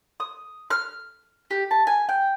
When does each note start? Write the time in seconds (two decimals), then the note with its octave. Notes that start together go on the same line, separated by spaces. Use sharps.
0.20 D#6
0.70 F6
1.51 G4
1.71 A5
1.87 G#5
2.09 G5